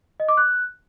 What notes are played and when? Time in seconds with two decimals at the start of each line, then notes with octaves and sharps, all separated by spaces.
0.20 D#5
0.28 D6
0.37 F#6